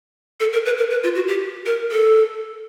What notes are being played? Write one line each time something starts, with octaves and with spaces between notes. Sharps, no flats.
A4
A#4
B4
A#4
B4
F4
F#4
G4
A#4
A4